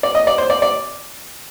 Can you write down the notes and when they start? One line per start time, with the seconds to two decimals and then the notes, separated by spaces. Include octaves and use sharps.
0.03 D5
0.15 D#5
0.27 D5
0.38 C5
0.50 D5
0.62 D5